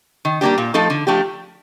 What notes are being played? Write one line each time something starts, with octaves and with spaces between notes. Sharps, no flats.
D#3
G3 A#3 D4 G4
A#2
F3 A3 D#4 A4
D3
F3 A3 D4 G4